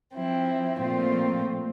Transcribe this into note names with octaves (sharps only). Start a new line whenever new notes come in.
F3 C4 E4
A#2 F3 A3 C4 F4